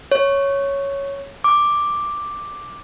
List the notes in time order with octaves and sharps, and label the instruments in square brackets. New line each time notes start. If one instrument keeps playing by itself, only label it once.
[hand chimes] C#5
D6